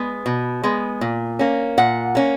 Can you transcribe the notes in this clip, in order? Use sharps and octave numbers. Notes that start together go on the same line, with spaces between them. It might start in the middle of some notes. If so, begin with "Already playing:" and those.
Already playing: G#3 B3
B2
G#3 B3
A#2
A#3 C#4
A#2 F#5
A#3 C#4